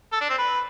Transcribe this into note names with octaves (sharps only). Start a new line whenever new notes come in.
A4
D4
C4
B4